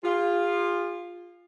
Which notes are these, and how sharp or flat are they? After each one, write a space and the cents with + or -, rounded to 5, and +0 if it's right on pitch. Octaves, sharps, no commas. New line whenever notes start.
F4 +5 G#4 -40